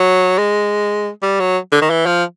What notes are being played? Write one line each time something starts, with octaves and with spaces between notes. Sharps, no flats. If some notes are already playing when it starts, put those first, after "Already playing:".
Already playing: F#3
G#3
G3
F#3
D3
D#3
E3
F3